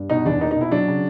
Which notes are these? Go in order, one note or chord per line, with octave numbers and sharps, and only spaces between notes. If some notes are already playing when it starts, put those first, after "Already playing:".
Already playing: G2
B2 D#4
E2 D4
A#3 D#4
D#4
B2 E4
F#3 D4
C#3